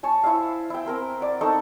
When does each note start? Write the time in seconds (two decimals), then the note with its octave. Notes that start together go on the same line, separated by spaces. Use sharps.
0.03 C#5 G#5 A5
0.23 E4 C5 E5 F5
0.70 E4 G5
0.86 C4 A#4 C5
1.21 D5 F#5
1.41 C4 D#4 A4 C#6